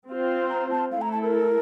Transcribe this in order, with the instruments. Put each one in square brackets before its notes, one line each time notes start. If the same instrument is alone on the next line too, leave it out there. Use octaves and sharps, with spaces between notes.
[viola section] C4 F4 C5
[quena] A#5
A5
[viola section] A3 E4 A4 [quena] F5
[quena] A#5
A5
A#4